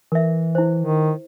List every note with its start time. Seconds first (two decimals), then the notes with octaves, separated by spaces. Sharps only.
0.12 E3 A#4 E5
0.55 E4 C5
0.81 D#3